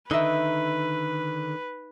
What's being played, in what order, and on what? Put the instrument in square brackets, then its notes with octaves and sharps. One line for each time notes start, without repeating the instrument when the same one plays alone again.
[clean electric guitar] D3 D#3 [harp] D#4 E5 [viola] B4